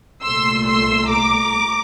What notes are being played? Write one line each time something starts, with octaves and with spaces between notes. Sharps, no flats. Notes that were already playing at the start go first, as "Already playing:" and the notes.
C2 A#2 A3 C6 E6
C6 E6
A#5 D6